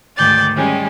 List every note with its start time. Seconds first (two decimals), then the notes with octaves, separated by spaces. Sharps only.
0.15 D2 G#2 D#3 D5 G6 A6
0.54 D#3 G3 G#3 C#4 G4